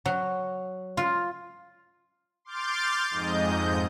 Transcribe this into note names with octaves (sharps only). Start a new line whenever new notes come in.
F#3
F4
C6 D6 F6 G6 A6
F2 G#2 D#5 G6